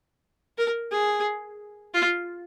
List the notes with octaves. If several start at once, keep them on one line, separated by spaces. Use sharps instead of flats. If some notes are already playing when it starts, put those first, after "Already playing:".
A#4
G#4
F4